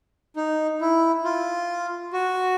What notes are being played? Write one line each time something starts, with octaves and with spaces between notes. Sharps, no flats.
D#4
E4
F4
F#4